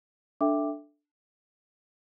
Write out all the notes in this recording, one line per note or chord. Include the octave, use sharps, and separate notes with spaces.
D4 A4 E5 G5 D6